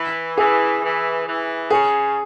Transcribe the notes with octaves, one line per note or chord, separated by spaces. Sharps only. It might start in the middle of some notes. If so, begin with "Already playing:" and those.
Already playing: E3
E3 G#4
E3
E3
C#3 G#4